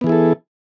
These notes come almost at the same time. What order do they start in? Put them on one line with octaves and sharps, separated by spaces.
B3 E3 G#4 E4 A4